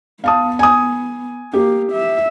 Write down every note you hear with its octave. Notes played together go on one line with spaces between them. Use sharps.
B3 F5 A5 D#6
G#5 D#6
A#3 G4
E5